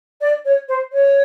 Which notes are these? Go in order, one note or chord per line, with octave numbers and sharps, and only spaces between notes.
D5
C#5
C5
C#5